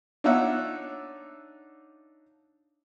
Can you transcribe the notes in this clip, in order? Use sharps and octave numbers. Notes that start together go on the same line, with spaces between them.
D4 D#4 F4 C#5 E5 F#5